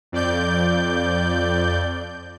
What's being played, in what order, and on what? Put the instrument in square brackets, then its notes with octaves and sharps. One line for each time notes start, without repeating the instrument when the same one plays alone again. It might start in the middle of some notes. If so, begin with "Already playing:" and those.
[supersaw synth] F2 D5 G6